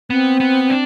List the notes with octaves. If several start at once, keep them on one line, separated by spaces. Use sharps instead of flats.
B3 C4
B3
D4